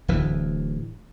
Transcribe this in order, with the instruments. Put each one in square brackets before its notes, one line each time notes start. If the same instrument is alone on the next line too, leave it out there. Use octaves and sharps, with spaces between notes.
[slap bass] D1 D2 E3